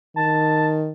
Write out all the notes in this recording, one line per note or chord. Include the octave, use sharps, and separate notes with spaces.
D#3 A5